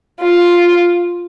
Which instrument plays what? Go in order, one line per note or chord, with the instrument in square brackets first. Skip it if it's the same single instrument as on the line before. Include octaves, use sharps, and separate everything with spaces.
[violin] F4